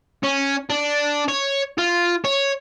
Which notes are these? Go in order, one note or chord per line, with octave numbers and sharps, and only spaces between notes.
C#4
D4
C#5
F4
C#5